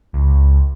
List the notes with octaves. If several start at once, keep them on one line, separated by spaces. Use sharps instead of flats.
C#2